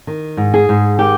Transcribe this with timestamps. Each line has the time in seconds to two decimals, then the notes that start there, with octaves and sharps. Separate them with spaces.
0.07 D#3
0.37 G#2
0.54 G#4
0.69 G#2
0.98 D#3 G4